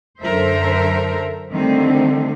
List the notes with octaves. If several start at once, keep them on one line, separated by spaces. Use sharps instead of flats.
F#2 D3 A4 A#4 C5 E5
D3 D#3 G3 A3 C4